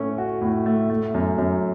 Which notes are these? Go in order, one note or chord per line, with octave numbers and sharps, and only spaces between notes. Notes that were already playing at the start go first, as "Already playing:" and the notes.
Already playing: A2 A3 C#4
F#4
A2
A3
A3
F#2
F#2